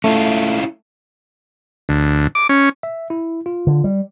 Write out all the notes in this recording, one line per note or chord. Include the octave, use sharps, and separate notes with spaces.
A3 C#4 E4 F4
D2
D6
C#4
E5
E4
F4
D3
G3